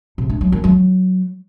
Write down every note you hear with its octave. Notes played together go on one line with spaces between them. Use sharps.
C3
D4
F#3
D#3
F#3